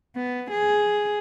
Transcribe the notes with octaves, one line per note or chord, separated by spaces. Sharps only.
B3
G#4